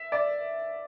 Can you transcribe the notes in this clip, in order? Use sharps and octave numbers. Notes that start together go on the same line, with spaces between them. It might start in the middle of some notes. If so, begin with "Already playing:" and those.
Already playing: E5
D5